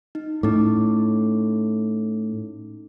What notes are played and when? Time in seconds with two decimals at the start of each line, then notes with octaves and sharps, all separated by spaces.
0.15 D#4
0.43 A2 C#4 D#4 D6